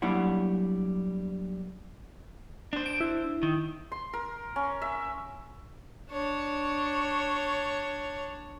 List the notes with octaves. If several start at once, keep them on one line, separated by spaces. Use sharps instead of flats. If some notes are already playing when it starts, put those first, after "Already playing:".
F#3 G3 A#3 D4 E4 F#5
D4 C5
D7
E4
D#3
C6
A#4
C#4
E5
D4 C#5